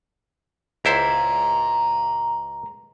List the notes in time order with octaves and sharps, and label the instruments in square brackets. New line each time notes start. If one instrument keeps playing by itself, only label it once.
[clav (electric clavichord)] C#2 E4 C5 [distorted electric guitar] A#5 C6